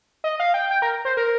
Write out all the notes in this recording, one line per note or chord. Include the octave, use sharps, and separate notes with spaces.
D#5
F5
G5
G5
A#4
C5
A#4